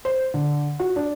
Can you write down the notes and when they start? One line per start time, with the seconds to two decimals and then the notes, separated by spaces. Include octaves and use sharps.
0.05 C5
0.34 D3
0.79 F#4
0.96 D4